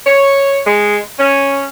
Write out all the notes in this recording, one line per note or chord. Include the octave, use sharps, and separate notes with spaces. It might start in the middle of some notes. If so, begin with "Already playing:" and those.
C#5
G#3
C#4